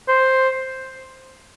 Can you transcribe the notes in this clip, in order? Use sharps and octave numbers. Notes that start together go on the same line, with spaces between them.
C5